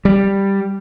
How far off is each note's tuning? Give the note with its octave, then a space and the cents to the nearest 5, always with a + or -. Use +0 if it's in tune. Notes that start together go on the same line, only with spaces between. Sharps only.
G3 +5